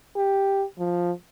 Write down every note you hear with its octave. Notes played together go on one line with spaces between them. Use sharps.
G4
F3